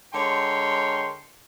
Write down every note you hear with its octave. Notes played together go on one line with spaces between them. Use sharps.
D3 G#3 A#4 C#5 G5 C6